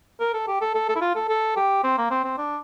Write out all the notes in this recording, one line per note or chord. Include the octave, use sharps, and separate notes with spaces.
A#4
A4
G4
A4
A4
A4
E4
F4
A4
A4
G4
C4
A#3
C4
C4
D4